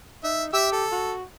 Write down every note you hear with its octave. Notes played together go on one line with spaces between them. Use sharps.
D#4 E5
G4 E5 E6
A4
F#4